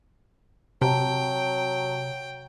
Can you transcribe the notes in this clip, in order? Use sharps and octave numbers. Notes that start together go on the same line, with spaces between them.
C3 F#3 G5 A5 A#5